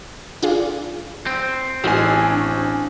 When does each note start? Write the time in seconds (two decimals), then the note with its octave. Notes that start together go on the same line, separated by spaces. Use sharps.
0.43 D4 F4 G#4
1.27 C4
1.84 A1 G#3 D#4 F#4 G#5
2.31 D4 C#6